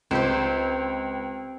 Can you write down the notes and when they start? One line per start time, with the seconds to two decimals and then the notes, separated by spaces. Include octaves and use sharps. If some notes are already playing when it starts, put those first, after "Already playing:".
0.11 C#2 C4 G4 C5